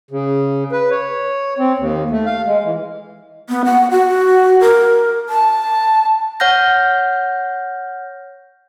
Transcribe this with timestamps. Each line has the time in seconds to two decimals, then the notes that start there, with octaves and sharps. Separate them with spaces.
0.11 C#3
0.72 B4
0.91 C#5
1.59 C4
1.79 D#2
2.11 A3
2.26 F5
2.46 G#3
2.64 E3
3.49 B3
3.65 F#5
3.91 F#4
4.61 A#4
5.29 A5
6.40 C#5 F#5 F6 G6 A#6